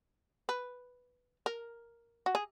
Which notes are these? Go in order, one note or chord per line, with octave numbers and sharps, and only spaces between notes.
B4
A#4
F#4
G#4